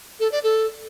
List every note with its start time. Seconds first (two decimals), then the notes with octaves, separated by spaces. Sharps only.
0.20 A4
0.32 D5
0.44 A4